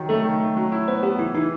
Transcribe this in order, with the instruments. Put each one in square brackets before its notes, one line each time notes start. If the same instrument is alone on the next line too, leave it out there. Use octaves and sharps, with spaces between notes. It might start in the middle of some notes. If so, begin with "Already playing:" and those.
Already playing: [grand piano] D#3 F#3
[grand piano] A3 [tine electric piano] A4
[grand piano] D#3
A3
F#3
E4
[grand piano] B3 [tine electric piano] C5
[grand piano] B3 [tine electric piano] G4
[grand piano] E3 [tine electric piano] E4
[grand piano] E3 [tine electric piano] D#4